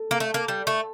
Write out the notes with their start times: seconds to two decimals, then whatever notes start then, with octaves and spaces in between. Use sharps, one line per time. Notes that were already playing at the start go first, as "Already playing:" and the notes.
Already playing: A4
0.11 A#3
0.20 A3
0.34 A#3
0.48 G3
0.67 A3